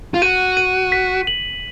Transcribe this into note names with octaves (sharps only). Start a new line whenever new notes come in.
F4
F#4 D#7
D#7
B6
F#7